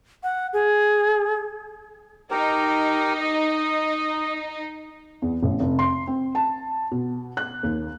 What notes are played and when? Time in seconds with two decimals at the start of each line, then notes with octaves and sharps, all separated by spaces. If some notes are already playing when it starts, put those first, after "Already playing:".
0.23 F#5
0.53 G#4
2.31 D#4 G4 A#4
3.21 D#5
5.22 E2
5.43 A1
5.60 F1
5.79 C6
6.07 C4
6.35 A5
6.91 B2
7.37 F#6
7.63 D#2